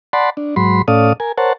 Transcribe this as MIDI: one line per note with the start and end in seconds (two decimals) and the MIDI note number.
0.13 0.30 74
0.13 0.30 78
0.13 0.30 81
0.13 0.30 83
0.13 0.30 84
0.37 0.55 62
0.56 0.82 44
0.56 0.82 54
0.56 0.82 83
0.56 0.82 84
0.88 1.13 45
0.88 1.13 61
0.88 1.13 69
0.88 1.13 74
0.88 1.13 77
0.88 1.13 87
1.20 1.32 70
1.20 1.32 80
1.38 1.53 70
1.38 1.53 72
1.38 1.53 73
1.38 1.53 78
1.38 1.53 81